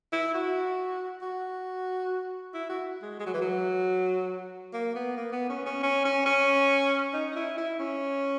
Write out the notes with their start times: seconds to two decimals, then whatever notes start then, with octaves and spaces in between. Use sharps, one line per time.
0.13 E4
0.34 F#4
1.22 F#4
2.54 E4
2.69 F#4
3.02 G#3
3.19 G#3
3.26 F#3
3.34 E3
3.41 F#3
4.73 A#3
4.95 B3
5.17 A#3
5.32 B3
5.49 C#4
5.66 C#4
5.83 C#4
6.05 C#4
6.26 C#4
7.14 D#4
7.32 D#4
7.35 E4
7.58 E4
7.79 C#4